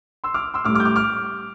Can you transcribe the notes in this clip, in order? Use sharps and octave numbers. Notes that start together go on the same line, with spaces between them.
C6 E6
D6 F6
C6 E6
A2 G3 D6 F6
D6 F6
G6
D6 F6
D6 F6